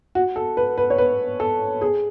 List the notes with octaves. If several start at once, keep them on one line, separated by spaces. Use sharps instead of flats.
F#4
A4
B4
B4
C#5
B4
A4
G#4